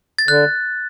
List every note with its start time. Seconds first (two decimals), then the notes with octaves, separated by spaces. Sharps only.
0.19 A6
0.28 D3 F#6